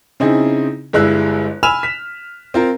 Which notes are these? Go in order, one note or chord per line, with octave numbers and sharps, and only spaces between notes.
C#3 C4 D#4 E4 G#4
G1 G3 G#3 E4 E6 F#6
G#5 B5 E6 F6 E7 F7
B6
C4 F4 A#4